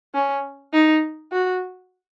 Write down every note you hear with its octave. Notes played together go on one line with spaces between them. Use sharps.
C#4
D#4
F#4